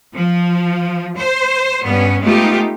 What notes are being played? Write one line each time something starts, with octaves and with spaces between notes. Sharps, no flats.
F3
C5
G2 B3 C#4
G#3 A3 B3 D#4 F4 G4